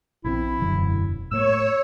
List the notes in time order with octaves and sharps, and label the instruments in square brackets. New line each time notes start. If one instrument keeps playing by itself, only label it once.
[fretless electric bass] A#1 D3 C4 [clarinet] E4
[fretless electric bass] E1 F#2 D3
[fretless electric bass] A2 A#3 [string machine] C#5 [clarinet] E6